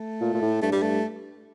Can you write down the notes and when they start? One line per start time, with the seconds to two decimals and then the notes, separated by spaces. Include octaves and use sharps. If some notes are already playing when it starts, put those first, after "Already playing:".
Already playing: A3
0.21 A#2
0.34 A#2
0.42 A2
0.62 G2 A3
0.72 G3
0.82 A3